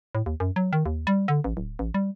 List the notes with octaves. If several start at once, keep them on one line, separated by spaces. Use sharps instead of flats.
A2
D#2
F#2
F#3
D#3
D#2
G3
D3
A1
D1
A1
G3